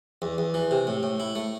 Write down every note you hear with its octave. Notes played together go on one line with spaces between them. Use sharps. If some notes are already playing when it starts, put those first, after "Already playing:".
E2
E2
E3
C3
A2
A2
E4
A3